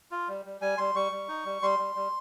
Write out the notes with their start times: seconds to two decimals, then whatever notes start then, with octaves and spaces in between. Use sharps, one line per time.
0.11 F4
0.28 G3
0.45 G3
0.61 G3 G#5
0.78 G3 C6
0.95 G3 C#6
1.12 G3
1.28 D#4
1.45 G3
1.62 G3 C6
1.79 G3
1.96 G3